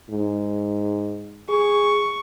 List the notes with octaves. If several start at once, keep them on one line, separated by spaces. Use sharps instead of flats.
G#2
G#4 C#6